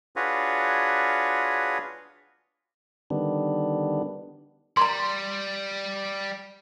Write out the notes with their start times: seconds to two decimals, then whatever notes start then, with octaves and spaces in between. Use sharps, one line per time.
0.16 D4 F4 F#4 G#4 B4 C#5
3.10 D3 D#3 G3 B3 D4
4.77 G3 A#5 C6